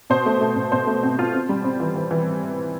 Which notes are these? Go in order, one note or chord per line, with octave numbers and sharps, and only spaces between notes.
B2 C5
A3
A3
B2
B2 C5
A3
C4
F4
C4
G3
C4
E3
E3
E3